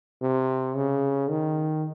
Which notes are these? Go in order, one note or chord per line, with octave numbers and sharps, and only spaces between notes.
C3
C#3
D#3